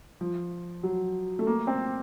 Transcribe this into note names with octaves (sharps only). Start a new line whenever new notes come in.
F3
F#3
A3
A#3
C4